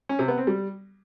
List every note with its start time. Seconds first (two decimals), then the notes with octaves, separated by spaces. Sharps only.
0.09 C#4
0.19 C3
0.28 B3
0.38 C4
0.47 G3